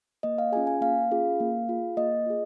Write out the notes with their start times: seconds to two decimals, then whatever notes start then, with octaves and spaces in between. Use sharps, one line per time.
0.23 A#3 D#5
0.38 F5
0.52 C#4 F4 G#4 G#5
0.67 G#5
0.81 A#3 F5
1.11 C#4 F4 G#4
1.40 A#3
1.69 F4 G#4
1.97 A#3 D#5
2.26 F4 G#4